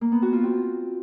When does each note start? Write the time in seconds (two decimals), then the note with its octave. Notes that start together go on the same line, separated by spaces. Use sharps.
0.01 A#3
0.12 B3
0.22 F#4
0.33 F4
0.43 C4